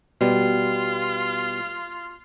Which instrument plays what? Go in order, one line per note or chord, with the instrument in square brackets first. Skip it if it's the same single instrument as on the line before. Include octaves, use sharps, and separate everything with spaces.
[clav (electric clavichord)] B2 G3 [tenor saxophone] F4